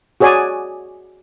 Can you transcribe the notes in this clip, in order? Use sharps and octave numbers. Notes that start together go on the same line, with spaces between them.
F#4 G#4 C#5 D5 G#5